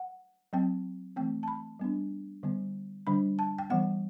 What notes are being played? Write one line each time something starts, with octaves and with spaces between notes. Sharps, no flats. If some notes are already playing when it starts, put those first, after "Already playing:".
Already playing: F#5
F#3 C4 G5
E3 A3 C4 G5
A5
B5
G3 B3 D4
D3 G3 B3
D3 G3 D4 B5
A5
G5
E3 G3 B3 F#5